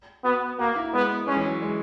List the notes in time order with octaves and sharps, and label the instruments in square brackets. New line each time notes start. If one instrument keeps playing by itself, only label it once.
[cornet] B3 [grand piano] F#4
[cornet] A#3 [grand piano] F#4
[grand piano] E4
[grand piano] G#3 [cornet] B3
[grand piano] G#3 [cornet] C#4
[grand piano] E3
F#3
G#3